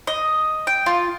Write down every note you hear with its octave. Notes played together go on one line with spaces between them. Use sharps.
D#5
G5
F4